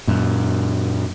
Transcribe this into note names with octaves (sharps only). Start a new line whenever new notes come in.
F#2 A#2